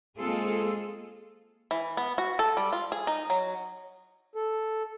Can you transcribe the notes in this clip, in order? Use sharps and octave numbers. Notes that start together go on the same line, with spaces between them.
G#3 A#3 C4 F4 G#4 A4
E3
B3
F#4
A4
G3
F4
G#4
D#4
F#3
A4